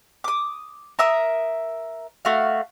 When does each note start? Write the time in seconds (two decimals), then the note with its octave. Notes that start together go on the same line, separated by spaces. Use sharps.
0.24 D6 D#6
0.99 A#4 E5 D#6
2.25 A3 F#4 F5